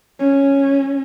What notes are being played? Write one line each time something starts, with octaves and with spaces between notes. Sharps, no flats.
C#4